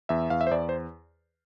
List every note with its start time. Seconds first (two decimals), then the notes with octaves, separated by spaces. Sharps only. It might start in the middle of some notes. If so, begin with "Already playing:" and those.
0.09 E2 E5
0.30 E2 F5
0.41 E5
0.47 C5
0.51 E2 D5
0.69 C5